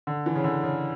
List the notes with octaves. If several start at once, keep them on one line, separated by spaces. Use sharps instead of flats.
D3
E3
C#3
D3
C#3